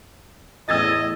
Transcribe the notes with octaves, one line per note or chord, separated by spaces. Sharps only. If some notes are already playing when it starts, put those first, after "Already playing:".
E2 A2 D#5 E6 G#6 A6